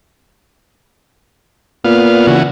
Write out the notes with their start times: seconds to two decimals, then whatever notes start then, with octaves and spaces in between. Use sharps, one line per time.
1.85 A#2 B3 F5
2.27 C#3 E3 F#4